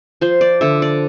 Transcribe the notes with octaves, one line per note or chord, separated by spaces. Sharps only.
F3 C5
D5
D3 E5
D5